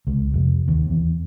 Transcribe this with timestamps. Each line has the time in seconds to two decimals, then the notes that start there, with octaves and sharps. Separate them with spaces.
0.07 C#2
0.34 F1
0.68 D#2
0.90 E2